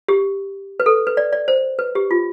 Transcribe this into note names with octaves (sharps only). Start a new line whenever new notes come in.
G4
B4
A4
B4
D5
D5
C5
B4
G4
F4